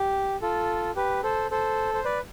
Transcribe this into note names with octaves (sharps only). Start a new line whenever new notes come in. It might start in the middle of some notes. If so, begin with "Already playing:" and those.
Already playing: G4
F4 A4
G4 B4
A4 C5
A4 C5
C5
B4 D5